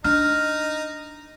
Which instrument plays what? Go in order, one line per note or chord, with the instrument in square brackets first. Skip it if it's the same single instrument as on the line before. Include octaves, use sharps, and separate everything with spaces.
[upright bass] D4 [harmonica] D#4 [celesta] F6